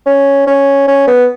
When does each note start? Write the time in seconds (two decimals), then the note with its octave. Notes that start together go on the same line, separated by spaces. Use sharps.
0.07 C#4
0.47 C#4
0.88 C#4
1.07 B3